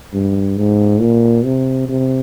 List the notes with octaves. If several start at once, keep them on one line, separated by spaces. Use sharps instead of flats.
G2
G#2
A#2
C3
C3